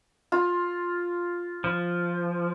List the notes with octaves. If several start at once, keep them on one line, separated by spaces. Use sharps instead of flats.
F4
F3